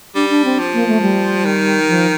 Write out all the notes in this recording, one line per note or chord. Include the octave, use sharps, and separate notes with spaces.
G3 D4
D4
C4
F3
A#3
A3
G3
D#3
F3